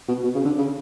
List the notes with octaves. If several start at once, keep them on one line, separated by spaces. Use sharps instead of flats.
B2
B2
C#3
D3
C#3